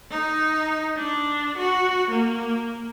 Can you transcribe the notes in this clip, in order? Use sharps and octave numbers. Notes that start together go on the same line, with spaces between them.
D#4
D4
F#4
A#3